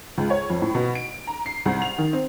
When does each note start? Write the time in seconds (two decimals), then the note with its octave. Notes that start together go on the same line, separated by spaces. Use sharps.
0.18 C#2
0.30 C#5
0.50 F2
0.62 A2
0.75 B2
0.95 D7
1.27 A#5
1.46 C7
1.66 C2
1.82 F7
1.98 D#3
2.13 C4